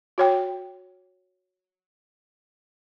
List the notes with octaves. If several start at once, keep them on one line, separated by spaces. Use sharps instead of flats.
F#4 C#5 G5